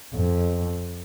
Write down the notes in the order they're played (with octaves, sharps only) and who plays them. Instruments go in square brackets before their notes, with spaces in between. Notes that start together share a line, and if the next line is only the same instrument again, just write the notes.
[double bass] F2